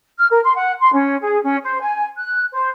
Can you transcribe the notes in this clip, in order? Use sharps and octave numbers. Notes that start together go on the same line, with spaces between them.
F6
A#4
C6
F#5
C6
C#4
G#4
C#4
C5
G#5
F#6
C5